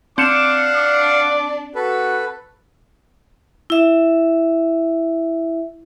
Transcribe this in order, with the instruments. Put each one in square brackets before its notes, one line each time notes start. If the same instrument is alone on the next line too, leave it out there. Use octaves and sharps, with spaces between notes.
[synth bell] C4 C#7 E7 [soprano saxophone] D4 [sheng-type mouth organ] F5 F#5 [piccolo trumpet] D6
[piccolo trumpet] D6
[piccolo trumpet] F#4 [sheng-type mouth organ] A4 B4
[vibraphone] E4 E5